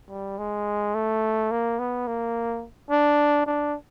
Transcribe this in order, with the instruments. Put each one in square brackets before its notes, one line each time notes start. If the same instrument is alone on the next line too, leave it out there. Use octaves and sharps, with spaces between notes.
[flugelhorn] G3
G#3
A3
A#3
B3
A#3
D4
D4